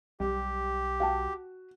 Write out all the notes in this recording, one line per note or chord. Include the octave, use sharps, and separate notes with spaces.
B1 G3 G4
F#4 F5 G5 A5